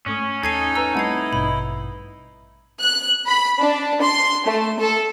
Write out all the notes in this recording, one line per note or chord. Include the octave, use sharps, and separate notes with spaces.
G#2 A3 C#4 D#6
D#2 C#4 D#4 A4 G#6 C7 D#7
B4 A#5 C#6 E6
G3 A3 C4 E4 F#5 G#6 C7
A1 G2 B2 B5
F#6
B5
D4
C6
A3
A4